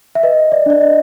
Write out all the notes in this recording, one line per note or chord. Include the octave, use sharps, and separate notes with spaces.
E5
B4 D#5
D5
D4 D5
D#5